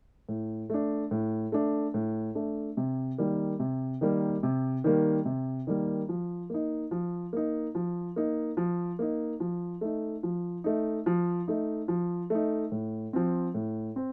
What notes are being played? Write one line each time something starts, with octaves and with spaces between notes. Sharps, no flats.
A2
A3 D4
A2
A3 D4
A2
A3 D4
C3
D#3 G3 A#3
C3
D#3 G3 A#3
C3
D#3 G3 A#3
C3
D#3 G3 A#3
F3
A#3 D#4
F3
A#3 D#4
F3
A#3 D#4
F3
A#3 D#4
F3
A3 D#4
F3
A3 D#4
F3
A3 D#4
F3
A3 D#4
A2
F3 C4
A2
C4